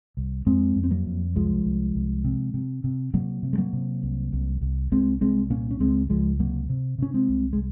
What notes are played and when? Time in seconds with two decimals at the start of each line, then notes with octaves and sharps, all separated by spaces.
0.17 C2
0.46 F2 G#3 C4
0.76 F2
0.84 C4
0.91 F#3 A#3
1.06 F2
1.36 C2 F3 G#3
1.65 C2
1.95 C2
2.25 C3
2.54 C3
2.84 C3
3.14 C3 F#3 A#3
3.43 C3
3.53 G#3
3.58 F#3 A#3
3.73 C3
4.03 C2
4.33 C2
4.61 C2
4.91 C2 G#3 C4
5.21 C2 G#3 C4
5.50 A#2 A#3 C#4
5.71 C#4
5.80 C#2 G#3 C4
6.10 C#2 F3 G#3
6.40 C3 F#3 A#3
6.69 C3
6.98 C3 C#4
7.14 G#3 C4
7.29 C2
7.53 G#3